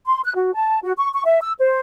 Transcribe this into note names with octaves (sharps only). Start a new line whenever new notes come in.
C6
F#6
F#4
A5
F#4
C#6
C#6
E5
E6
C5